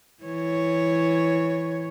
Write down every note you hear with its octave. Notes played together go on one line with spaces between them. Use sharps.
E3 C#5